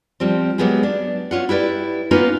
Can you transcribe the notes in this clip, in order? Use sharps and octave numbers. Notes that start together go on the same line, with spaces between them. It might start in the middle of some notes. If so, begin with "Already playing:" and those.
F3 G3 C4
F#3 G#3 A#3 B3 G4 G#4
D4
C#4 F4 F#5
E4 G4 B4 D5
A#3 B3 C#4 D#4 F4 B4